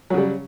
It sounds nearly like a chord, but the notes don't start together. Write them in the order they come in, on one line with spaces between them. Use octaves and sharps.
F#3 C#3 G3